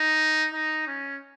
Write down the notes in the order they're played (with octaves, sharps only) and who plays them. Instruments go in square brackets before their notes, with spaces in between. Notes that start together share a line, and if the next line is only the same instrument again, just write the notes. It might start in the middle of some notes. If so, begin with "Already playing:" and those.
Already playing: [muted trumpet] D#4
D#4
C#4